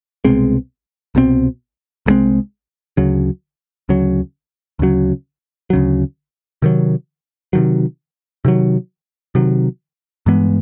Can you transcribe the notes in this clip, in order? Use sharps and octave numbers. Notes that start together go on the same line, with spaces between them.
C2 B2 G#3 C4
C2 B2 G#3 C4
C2 B2 G#3 C4
D2 C#3 F#3
D2 C#3 F#3
D2 C#3 F#3
D2 C#3 F#3
C3 D#3 F#3
C3 D#3 F#3
C3 D#3 F#3
C3 D#3 F#3
G2 E3 G#3 B3